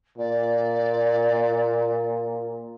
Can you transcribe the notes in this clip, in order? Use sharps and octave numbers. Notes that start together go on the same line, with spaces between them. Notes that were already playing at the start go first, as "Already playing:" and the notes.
A#2 D5